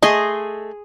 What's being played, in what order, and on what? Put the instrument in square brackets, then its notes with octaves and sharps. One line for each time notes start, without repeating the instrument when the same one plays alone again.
[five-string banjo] A3 D#5 [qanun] G#4 C6